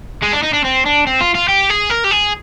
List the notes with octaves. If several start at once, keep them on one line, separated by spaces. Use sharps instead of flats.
G#3
D4
D#4
D4
C4
D4
C4
F4
F4
G4
G#4
A#4
G4
G#4